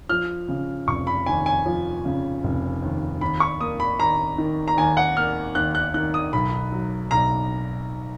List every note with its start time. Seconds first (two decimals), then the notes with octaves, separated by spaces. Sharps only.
0.09 F3 F6
0.48 C#3
0.87 F1 C#6
1.07 B5
1.26 D#2 G#5
1.46 G#5
1.66 F3
2.05 C#3
2.43 F1
2.82 D#2
3.21 D#2 B5
3.40 C#6
3.60 A#3 D#6
3.80 B5
3.99 D#2 A#5
4.38 D#3
4.68 A#5
4.77 D#2 G#5
4.97 F#5
5.16 A#3 F6
5.55 D#2 F#6
5.75 F#6
5.94 D#3 F#6
6.14 D#6
6.33 B1 B5
6.72 F#3
7.11 B1 A#5